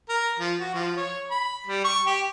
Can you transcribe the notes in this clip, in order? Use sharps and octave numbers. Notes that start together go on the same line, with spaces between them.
A#4
F3
F#4
F3
C#5
B5
G3
C#6
G4